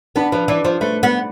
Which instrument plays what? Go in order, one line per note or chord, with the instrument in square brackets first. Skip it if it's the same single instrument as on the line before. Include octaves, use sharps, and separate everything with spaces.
[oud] B3 [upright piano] D4
[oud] F3 [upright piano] B4
[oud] E3 [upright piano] D5
[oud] F3 [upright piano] C5
[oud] A3 [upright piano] B4
[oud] B3